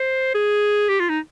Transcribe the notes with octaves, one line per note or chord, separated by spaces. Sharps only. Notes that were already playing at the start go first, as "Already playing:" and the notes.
Already playing: C5
G#4
G4
F4
D#4